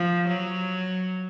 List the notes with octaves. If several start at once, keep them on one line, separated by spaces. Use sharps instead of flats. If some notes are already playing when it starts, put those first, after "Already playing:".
Already playing: F3
F#3